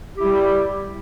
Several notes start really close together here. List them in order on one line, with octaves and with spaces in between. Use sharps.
G4 E4 G3